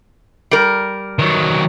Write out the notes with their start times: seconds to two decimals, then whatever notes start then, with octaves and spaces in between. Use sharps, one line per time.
0.51 G3 A#4
1.19 D#3 F#3